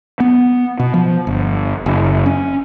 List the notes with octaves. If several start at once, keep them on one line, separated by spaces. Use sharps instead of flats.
B3
B2
F3
G1
F#1
C#4